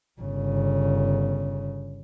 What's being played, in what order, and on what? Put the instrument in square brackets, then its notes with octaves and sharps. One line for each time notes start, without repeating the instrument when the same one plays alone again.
[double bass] G1 C#3